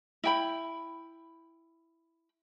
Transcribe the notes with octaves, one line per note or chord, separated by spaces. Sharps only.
E4 G5 B5